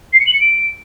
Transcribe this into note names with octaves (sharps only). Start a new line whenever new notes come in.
C7
C#7
F#7
C#7
D7